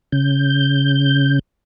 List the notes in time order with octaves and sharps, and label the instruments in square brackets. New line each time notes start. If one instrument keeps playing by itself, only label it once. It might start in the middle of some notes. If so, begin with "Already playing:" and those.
[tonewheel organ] C#3 G6